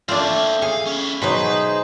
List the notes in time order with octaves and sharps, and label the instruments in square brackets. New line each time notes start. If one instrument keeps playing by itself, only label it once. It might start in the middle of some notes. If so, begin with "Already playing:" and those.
[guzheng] A3 [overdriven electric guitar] C4 C#5 [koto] D4 F4
[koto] G#4 [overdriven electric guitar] F5
[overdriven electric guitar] C#4 E4
[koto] B2 F#3 [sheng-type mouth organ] D#4 G#4 C5 [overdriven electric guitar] B4